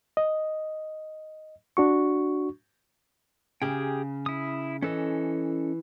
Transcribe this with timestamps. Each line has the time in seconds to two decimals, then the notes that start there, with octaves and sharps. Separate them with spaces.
0.17 D#5
1.77 D4 F#4 C#6
3.62 C#3 G4 G#4 G5
4.26 E4 D#6
4.82 E3 C#4 A4 D#5